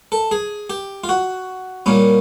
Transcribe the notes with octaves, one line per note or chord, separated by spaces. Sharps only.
A4
G#4
G4
F4
F#4
A#2 G3 A#3 C#4